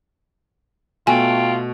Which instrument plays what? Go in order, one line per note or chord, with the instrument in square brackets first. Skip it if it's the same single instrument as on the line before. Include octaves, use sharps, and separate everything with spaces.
[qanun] B2 A3 [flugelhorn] F4 [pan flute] G5 [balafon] G#5